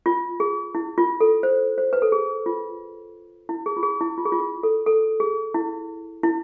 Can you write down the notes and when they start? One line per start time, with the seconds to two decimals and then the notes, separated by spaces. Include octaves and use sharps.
0.06 F4
0.40 G#4
0.75 E4
0.98 F4
1.21 A4
1.43 C5
1.78 C5
1.93 B4
2.02 A4
2.12 G#4
2.46 F4
3.49 E4
3.66 G#4
3.77 F4
3.83 G#4
4.01 E4
4.18 F4
4.25 G#4
4.32 F4
4.40 G#4
4.63 A4
4.86 A4
5.20 G#4
5.54 E4
6.23 E4